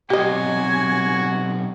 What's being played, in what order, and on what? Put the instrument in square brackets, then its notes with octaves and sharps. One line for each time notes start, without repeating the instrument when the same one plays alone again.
[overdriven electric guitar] B1 C3 [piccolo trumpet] F#4 [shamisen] G4 D#5 [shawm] G#5